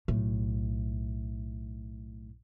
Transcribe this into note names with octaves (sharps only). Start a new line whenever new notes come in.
B1 A2